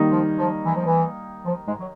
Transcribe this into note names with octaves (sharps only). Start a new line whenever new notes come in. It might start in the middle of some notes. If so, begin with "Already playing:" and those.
Already playing: D#3 G3 A#3 D#4
F3
F3
E3
F3
E3
F3
G#2 G#3
F#3